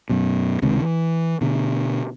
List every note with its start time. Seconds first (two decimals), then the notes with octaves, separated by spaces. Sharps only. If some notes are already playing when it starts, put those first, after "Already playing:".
0.09 F#2 B2
0.62 C#2 C3 D#3 G#3
0.81 E3
1.41 B2 D3